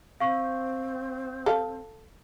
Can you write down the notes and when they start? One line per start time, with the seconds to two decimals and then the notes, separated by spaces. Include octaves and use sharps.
0.20 C4 F5 C#6
1.46 A4 F5